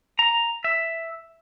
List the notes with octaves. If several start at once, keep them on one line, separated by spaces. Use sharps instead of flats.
A#5
E5